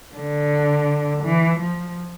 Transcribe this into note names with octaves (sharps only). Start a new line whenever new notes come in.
D3
E3
F3